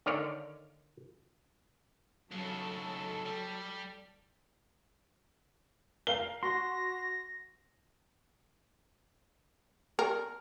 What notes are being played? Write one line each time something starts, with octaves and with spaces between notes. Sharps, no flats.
D3 D#3 C#5 D5 F5
D#2 C#3 F#3 A4
G3
A#4 F5 G7
F#4 C6 A#6
A#4